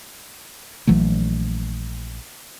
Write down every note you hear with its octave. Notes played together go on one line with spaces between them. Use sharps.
A#1 E3 F#3 A3